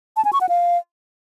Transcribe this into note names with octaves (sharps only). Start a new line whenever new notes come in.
A5
G#5
C#6
F#5
F5